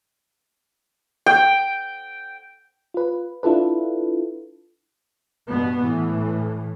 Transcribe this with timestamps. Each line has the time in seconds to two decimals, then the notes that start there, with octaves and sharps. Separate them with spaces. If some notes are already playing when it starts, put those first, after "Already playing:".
1.26 G5
2.94 F4 B4
3.43 D4 E4 F4 A4 B4
5.48 G2 B2 B3
5.83 A2 E3